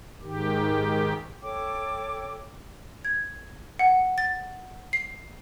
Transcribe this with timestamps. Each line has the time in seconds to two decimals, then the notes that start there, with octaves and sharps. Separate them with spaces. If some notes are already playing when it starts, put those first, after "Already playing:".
0.22 G#2 D#3 G4
1.41 A4 C#5 G5 D6
3.05 G#6
3.79 F#5
4.18 A6
4.93 C7